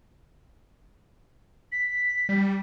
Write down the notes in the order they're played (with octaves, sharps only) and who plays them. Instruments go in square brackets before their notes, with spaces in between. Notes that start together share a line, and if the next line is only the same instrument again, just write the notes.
[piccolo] B6
[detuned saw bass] G3